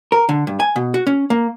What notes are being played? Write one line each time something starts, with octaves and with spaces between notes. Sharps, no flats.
A#4
D3
G2
G#5
B2
F#4
C#4
A#3